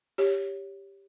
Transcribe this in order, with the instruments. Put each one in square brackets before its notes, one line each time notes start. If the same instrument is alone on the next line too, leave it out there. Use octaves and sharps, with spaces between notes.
[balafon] G4 C#5